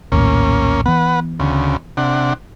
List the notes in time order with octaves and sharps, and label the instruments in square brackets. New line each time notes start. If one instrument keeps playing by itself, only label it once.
[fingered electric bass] A#1 D#2 A2 [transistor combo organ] A#3 C#4
[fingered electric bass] E3 B3 [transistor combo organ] B4 F#5
[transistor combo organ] D2 C#3
C3 D4 F#5